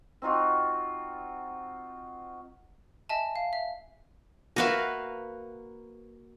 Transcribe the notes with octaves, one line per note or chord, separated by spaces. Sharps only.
C4 D#4 F4 F#4
D#5 E5 G#5 A5
F5
E5
A#3 F#4 A#4 B4 E5 F5